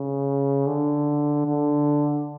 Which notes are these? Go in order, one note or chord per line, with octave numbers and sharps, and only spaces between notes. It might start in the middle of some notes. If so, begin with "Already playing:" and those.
Already playing: C#3
D3
D3